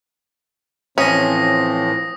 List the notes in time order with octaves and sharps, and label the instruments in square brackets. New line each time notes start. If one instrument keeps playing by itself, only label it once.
[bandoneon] A2 E3 F3 [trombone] C4 [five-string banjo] C#4 [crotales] D#6 A#6